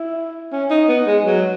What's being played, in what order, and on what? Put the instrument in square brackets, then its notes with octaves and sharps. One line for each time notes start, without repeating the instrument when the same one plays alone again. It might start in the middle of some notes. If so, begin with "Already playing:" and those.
Already playing: [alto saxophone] E4
C#4
D#4
B3
G#3
F#3